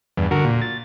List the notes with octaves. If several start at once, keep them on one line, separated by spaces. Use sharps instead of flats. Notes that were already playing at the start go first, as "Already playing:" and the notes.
E2 G2
D3 F#4 A#4
A#2
A6